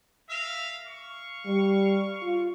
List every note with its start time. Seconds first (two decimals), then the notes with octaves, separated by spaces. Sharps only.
0.29 A#4 E5 F5
0.87 F5 C#6
1.45 G3
2.22 F4